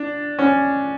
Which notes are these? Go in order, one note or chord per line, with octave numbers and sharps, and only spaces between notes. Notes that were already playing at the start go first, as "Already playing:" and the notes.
Already playing: D4
C#4